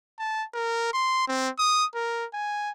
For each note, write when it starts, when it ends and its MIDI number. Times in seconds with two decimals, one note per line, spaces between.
0.19 0.45 81
0.54 0.93 70
0.93 1.27 84
1.28 1.49 60
1.59 1.85 87
1.95 2.25 70
2.34 2.72 80